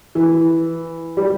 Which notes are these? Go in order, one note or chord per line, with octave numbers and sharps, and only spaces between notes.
E3
G3